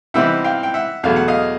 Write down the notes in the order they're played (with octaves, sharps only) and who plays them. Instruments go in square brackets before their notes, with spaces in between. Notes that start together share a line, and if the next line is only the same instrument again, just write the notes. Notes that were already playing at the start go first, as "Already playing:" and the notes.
[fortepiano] C3 E3 G3 C4 D#4 E5 F#5
F5 G5
G5
E5 F#5
E2 B2 F#3 A3 F5
F#5
D#5 F5